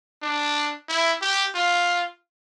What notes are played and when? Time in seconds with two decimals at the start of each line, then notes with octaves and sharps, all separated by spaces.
0.22 D4
0.88 E4
1.21 G4
1.55 F4